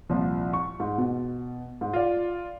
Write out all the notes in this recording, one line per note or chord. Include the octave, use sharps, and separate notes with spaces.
C2 A#2 F3
C#6
G#2
B2
G#2
F4 D5